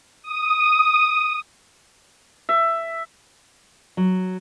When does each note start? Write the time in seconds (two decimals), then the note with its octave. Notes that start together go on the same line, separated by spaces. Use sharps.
0.23 D#6
2.49 E5
3.97 F#3